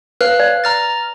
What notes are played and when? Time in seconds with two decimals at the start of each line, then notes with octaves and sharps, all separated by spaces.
0.21 B4 F5 F6 F#6
0.40 D5
0.64 A#5 F6 A6